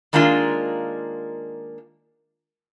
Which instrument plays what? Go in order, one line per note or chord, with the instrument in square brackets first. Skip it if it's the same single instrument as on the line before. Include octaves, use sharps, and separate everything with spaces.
[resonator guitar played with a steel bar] D#3 G#3 A#3 D4 F4